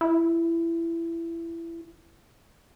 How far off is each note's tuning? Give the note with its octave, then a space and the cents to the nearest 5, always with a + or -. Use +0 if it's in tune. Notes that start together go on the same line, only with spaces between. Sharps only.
E4 +20